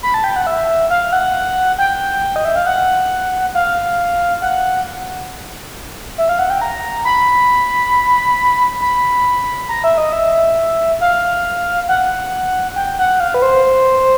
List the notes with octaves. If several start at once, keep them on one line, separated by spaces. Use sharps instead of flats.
B5
A5
G5
F#5
E5
F5
F#5
G5
D#5
E5
F5
F#5
F5
F#5
E5
F5
F#5
G5
A#5
B5
B5
A#5
E5
D#5
E5
F5
F#5
G5
F#5
F5
B4
C5